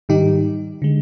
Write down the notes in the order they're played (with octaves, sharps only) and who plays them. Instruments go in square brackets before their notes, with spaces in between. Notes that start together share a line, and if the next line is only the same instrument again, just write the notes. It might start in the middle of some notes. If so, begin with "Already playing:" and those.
[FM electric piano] G#2 D#3 G3 D#4 G4
D3 G#3